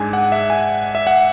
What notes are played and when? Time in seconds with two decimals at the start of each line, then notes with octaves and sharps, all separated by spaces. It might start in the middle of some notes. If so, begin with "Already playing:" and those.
Already playing: G#2 G#3 D4 G#5
0.13 F#5
0.32 E5
0.50 G#5
0.95 E5
1.07 F#5